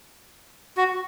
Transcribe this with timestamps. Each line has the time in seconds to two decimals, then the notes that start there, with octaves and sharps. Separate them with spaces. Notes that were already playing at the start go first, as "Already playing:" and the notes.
0.77 F#4